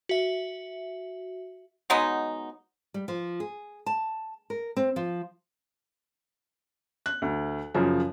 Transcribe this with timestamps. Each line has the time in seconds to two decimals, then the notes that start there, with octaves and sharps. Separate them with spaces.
0.09 F#4 E5
1.90 F#3 G#3 B3 D#4
2.94 G3
3.08 F3
3.40 G#4
3.86 A5
4.50 A#4
4.76 C4
4.96 F3
7.06 F#6
7.22 D2
7.74 F#2 C#3 F3